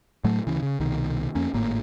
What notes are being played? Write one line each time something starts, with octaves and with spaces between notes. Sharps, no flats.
A2 F#3 A3
D2 C#3 E3
C#3
C2 B2 D#3
F2 A#3 C#4
G#1 A2 A#3